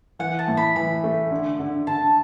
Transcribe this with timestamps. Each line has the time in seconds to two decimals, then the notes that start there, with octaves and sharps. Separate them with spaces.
0.19 E3 F#5
0.39 A5
0.48 A2
0.57 B5
0.76 E3 B5
1.04 A3
1.31 D3
1.59 D3
1.87 D3 A5